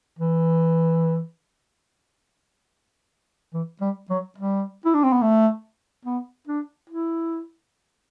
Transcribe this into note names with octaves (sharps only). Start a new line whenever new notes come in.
E3
E3
G3
F#3
G3
E4
D4
C4
B3
A3
B3
D4
E4